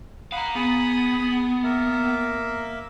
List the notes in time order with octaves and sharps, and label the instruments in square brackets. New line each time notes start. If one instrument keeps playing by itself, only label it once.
[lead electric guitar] F5 A#5 [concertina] F#5 B5 D#6
[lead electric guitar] B3 [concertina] G#4 B5 D#6
[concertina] A#3 A#4 E5